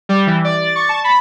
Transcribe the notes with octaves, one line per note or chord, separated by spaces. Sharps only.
G3
E3
D5
A6
C#6
A5
B5